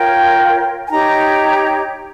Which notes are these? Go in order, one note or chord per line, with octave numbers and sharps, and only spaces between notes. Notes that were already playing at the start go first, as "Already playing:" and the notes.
Already playing: F4 A#4 C#5 G5
G#5
D#4 G4 C#5 A#5